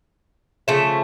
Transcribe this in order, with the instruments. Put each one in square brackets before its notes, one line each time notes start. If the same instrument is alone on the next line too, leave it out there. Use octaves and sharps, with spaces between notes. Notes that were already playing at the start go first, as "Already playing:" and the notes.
[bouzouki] C#3 F3 A3 E5